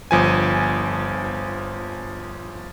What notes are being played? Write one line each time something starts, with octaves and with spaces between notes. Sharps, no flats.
G1 F3 G#5